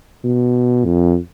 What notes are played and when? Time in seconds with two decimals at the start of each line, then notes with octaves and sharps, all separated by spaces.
0.24 B2
0.85 F2